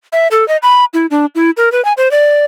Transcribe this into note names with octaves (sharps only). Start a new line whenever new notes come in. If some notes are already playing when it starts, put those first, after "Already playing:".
E5
A4
D#5
B5
E4
D4
E4
A#4
B4
G#5
C5
D5